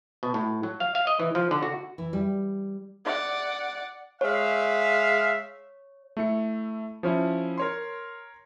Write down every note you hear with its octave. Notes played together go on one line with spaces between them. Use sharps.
B2
A2
F#3
F5
F5
D#5
E3
F3
D3
F#4
E3
G3
D5 F#5
G#3 C#5 E5 F5
A3 E4 C#7
F3 C#4 E4
A#4 C#5 C6